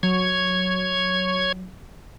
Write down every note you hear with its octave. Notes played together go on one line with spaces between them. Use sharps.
F#3 C#5 G#6